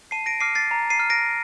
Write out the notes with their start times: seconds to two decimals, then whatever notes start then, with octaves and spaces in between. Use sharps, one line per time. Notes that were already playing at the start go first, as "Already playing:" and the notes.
0.11 A5 C7 D#7
0.26 A#6 D7
0.40 D6 F6 C7 D#7
0.55 A6 C7
0.71 A#5
0.90 C7 D#7
0.99 F6
1.10 A#6 D7